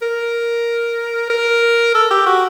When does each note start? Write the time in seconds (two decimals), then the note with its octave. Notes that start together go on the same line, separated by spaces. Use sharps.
0.02 A#4
1.30 A#4
1.95 A4
2.11 G4
2.26 F#4